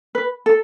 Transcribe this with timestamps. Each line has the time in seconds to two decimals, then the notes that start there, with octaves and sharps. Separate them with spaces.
0.15 B4
0.46 A4